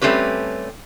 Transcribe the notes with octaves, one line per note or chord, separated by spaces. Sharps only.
G3 A3 C4 C#4 G4 B4